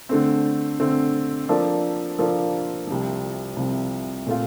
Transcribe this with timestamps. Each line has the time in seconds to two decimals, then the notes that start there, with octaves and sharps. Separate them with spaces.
0.09 D3 A3 C4
0.80 D3 A3 C4
1.49 F3 A#3 D4 F4 A4
2.19 F3 A#3 D4 F4 A4
2.87 C2 C3 F3
3.57 C2 C3 F3
4.26 A#2 A3 C4 F4